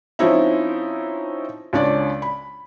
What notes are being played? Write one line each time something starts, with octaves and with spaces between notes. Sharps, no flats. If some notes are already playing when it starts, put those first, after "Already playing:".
F3 C4 C#4 D#4 E4
C#2 C#4 D4 D5
B5